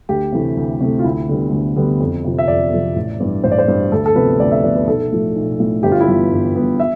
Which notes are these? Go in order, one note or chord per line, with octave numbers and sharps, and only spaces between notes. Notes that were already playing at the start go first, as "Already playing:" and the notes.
D2 G4
C3 E3 A3
D2
C3 E3 A3
F4
D2 E4
D3 G3 B3
D2
D3 G3 B3
F2
C3 F3
E5
F2 D5
C3 F3
A1
G2 E3
A1 C5
D5
C5
G2 E3
D2 A4
A4
C3 F3 B3 B4
D2 D5
E5
C3 F3 B3 D5
B4
B1 A4
A2 F3 A3
B1
A2 F3 A3
G1 G4
F4
E4
G2 E3 B3 F4
G1
G2 E3 B3
E5